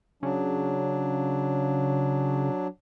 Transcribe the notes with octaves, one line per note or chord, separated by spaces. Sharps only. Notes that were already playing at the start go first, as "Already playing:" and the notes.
C#3 F#3 D4